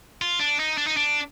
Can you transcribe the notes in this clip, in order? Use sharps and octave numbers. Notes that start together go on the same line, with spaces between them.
F4
D4
D#4
D4
D#4
D4